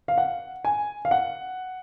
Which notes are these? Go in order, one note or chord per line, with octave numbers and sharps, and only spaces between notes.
F5
F#5
G#5
F5
F#5